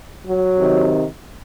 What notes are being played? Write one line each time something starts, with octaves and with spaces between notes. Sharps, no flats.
F#3
C3 D#3